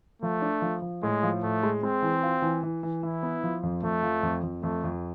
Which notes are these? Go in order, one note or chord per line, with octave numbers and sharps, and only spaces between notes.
F3 A3
D4
F3
F3
A2 G#3
F3
A2 A3
G#3
G#3 C4
E3
F4
E3
E3
E3
E3 E4
B3
F3
F2
F2 A3
F3
F2
F2
F2 A3
F2